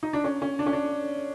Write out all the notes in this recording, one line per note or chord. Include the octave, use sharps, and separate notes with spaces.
D#4
D4
C#4
C#4
D4
C#4
D4